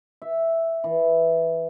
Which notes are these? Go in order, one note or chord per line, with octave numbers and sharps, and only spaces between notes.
E5
E3